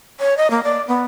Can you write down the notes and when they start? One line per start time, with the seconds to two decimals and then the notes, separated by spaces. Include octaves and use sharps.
0.20 C#5
0.37 D#5
0.50 A#3
0.63 D5
0.88 B3